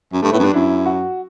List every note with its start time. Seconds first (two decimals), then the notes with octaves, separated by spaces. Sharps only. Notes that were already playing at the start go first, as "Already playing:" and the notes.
0.12 F#2
0.22 G2 A3
0.32 A2 B3
0.39 F#2
0.44 G2 D4
0.53 F#2 E4
0.86 F#4